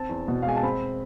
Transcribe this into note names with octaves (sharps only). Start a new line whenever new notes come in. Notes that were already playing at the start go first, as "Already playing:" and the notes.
Already playing: C4 A5
E2
B2
F5
G#3 G#5
A5
C4 B5